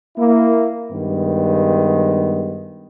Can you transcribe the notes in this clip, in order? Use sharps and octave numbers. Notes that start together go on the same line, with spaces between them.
A#3 E4
G2 D#3 G#3 B3